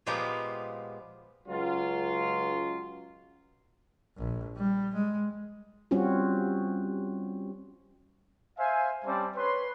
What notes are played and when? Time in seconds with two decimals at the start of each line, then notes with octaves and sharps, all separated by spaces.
0.06 A#2 F3 G#3 B3 G4 A#5
1.48 C#2 F#3 F4
4.17 A#1
4.56 G3
4.94 G#3
5.91 G3 C4 C#4 F4 F#4
8.58 C5 E5 F5 G#5
9.05 G3 C4 C#4 C5 D5 A5
9.36 B4 C#5 C6